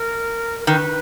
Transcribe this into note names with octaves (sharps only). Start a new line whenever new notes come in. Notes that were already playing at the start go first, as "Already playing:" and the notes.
Already playing: A#4
A#4
D#3 B4